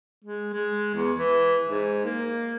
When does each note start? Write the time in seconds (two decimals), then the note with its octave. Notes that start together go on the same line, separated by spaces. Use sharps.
0.24 G#3
0.53 G#3
0.95 E2
1.17 E3
1.69 G#2
2.05 A#3